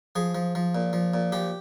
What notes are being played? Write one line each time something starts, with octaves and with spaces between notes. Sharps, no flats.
F3 G#4
F3
F3
A#2
F3
A#2
F3 G4